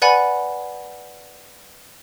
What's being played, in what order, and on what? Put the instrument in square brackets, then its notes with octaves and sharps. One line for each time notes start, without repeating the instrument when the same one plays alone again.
[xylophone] B4 D5 F#5 G#5 B5